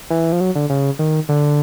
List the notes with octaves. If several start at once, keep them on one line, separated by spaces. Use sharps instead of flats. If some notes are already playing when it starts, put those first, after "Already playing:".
E3
F3
F#3
D3
C#3
D#3
D3